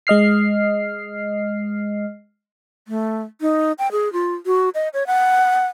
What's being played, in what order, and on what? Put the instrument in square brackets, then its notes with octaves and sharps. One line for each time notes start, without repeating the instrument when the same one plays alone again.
[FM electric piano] G#3 D#5 F6 C7
[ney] A3
D#4
G5
G#4
F4
F#4
D#5
C#5
F#5